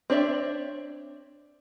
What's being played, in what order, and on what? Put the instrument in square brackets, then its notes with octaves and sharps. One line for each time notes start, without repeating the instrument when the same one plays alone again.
[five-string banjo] C4 D4 C#5 D5 E5